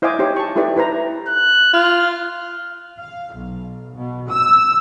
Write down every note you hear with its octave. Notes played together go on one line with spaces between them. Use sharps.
E4 C5 D#5 F5 G#5 D6
D#4 G4 C5 C#5
A5 C#6
D#4 E4 G4 A4 B4 D5
E4 B4 C5 A#5
F#6
F4 F6
F5
B1
B2
E6